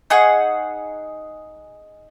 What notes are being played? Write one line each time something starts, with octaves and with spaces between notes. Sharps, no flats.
D#4 G#4 F#5 C#6